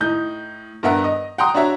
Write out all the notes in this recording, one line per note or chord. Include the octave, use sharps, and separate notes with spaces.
A2 D#4 G6
G2 B3 A#4 E5 F#5
D#5
F#5 G5 A#5 C6 D#6
D4 F#4 C#5 E5 A#5